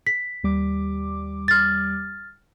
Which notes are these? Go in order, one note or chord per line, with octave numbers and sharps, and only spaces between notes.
B6
D#2 G3 D6
F6 A6